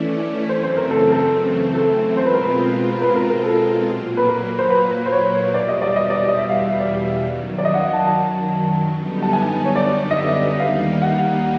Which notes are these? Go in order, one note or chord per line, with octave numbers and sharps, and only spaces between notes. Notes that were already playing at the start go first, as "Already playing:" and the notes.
Already playing: E3 A3 C#4 E4 D5
F#2 C#3 E3 A3 C4 C5
C5
A#4
A4
A4
A4
B2 G#3 C4 F4 C5
B4
A#4
B4
B4
A#4
A#4
A4
A#2 F#3 A#3
B4
A#4
C5
B4
C5
C#5
E2 B2 G3 D5
D#5
D5
D#5
D5
D#5
E5
F5
E5
D5
F#2 D#3 F#3
D5
D#5
F#5
F5
A5
A5
F#2 D3 G3 B3 D#4
A5
G#5
C#5
D5
D#5
E5
D#2 D#3 G3 A#3 D#4 F5
F#5